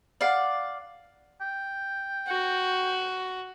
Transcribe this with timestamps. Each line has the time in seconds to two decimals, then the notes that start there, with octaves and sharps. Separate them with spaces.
0.21 D5 F5 F#5
1.41 G5
2.28 F#4